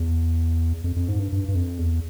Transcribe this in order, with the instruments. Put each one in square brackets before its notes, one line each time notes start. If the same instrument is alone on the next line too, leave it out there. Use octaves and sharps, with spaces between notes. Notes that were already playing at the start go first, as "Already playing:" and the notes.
Already playing: [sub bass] E2
F2
F2
G#2
G2
G2
G2
F2
E2